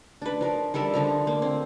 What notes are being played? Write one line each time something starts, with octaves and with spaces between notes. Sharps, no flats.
D4 B4
F3 A#4
G3 A4 A#4 E5
D3 F3 A#5
A#3
C4